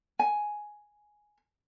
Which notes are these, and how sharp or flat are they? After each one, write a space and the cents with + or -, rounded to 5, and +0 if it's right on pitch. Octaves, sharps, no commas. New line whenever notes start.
G#5 +5